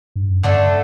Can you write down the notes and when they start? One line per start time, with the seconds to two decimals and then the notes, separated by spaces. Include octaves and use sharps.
0.16 G2
0.29 F#2
0.43 G2 D3 A3 D4 A4